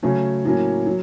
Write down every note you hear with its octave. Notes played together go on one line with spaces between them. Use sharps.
C#3 F#3 A3 C#4
A2 F#3 A#3 C#4
F#3